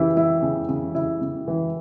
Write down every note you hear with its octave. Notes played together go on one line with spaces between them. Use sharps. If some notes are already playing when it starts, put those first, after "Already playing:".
Already playing: C#3 E3 E4 G4
E3 E4
C#3
C#3
C#3 E4
C#3
E3